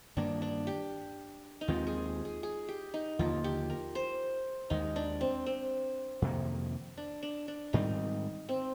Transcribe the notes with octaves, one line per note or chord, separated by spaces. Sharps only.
G2 D#3 A#3 D4
D4
G4
D#4
D#2 D#3 G#3 C4 F4
G#4
G#4
G#4
G4
D#4
D#2 D3 F3 A#3 F4
G4
A#4
C5
D#2 D#3 G#3 D#4
D4
C4
C4
F2 C3 D#3 A#3
D4
D4
D4
G#2 D#3 G3 C4 D#4
C4